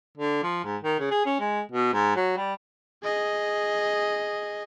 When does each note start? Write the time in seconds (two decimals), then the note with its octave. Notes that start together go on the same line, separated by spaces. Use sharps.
0.18 D3
0.43 F3
0.64 G#2
0.83 D#3
0.99 C#3
1.11 G#4
1.26 C#4
1.40 G#3
1.72 B2
1.93 G#2
2.16 F#3
2.37 G3
3.03 G#4 D#5